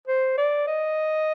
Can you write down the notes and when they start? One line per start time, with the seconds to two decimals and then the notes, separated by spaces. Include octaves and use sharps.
0.08 C5
0.38 D5
0.67 D#5